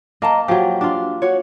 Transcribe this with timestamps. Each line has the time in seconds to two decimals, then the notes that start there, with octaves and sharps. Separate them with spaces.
0.22 A#3 D#5 A5 A#5
0.48 F3 F#3 G4
0.81 D4 F4
1.22 F#4 C#5